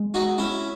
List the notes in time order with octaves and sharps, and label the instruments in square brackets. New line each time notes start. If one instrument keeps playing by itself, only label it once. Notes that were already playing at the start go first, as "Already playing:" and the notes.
Already playing: [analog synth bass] G#3
[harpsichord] D#4 F#4
C#4 E4